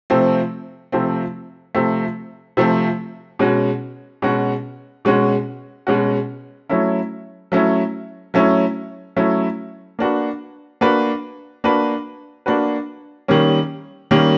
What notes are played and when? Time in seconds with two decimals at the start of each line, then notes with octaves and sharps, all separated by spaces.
0.10 C3 F3 A3 C4
0.92 C3 F3 A3 C4
1.75 C3 F3 A3 C4
2.57 C3 F3 A3 C4
3.39 B2 G#3 C#4 F#4
4.22 B2 G#3 C#4 F#4
5.05 B2 G#3 C#4 F#4
5.87 B2 G#3 C#4 F#4
6.70 F#3 A3 C#4 E4
7.52 F#3 A3 C#4 E4
8.34 F#3 A3 C#4 E4
9.16 F#3 A3 C#4 E4
9.99 A#3 D4 F#4 B4
10.81 A#3 D4 F#4 B4
11.64 A#3 D4 F#4 B4
12.46 A#3 D4 F#4 B4
13.28 D#3 G3 A#3 C#4
14.11 D#3 G3 A#3 C#4